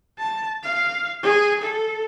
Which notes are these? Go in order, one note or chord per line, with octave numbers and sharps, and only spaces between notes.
A5
F5
G#4
A4